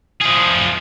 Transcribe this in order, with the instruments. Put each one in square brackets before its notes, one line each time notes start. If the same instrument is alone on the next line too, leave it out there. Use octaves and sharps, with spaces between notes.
[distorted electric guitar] F3 G#4